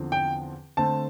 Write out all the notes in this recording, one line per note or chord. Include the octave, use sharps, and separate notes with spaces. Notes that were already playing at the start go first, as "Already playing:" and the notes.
Already playing: E2 D3 F3 C4
G5
D3 A3 C4 A5